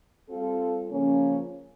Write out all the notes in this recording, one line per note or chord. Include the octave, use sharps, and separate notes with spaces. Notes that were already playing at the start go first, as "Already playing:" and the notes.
G3 C4 F4 A4
C#3 F3 A#3 C#4